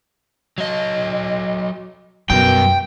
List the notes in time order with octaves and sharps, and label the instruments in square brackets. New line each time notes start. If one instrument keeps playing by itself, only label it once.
[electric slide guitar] F#3 D#5
[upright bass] F#2 [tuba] B2 [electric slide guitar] G3 F#4 A#4 [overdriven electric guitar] G5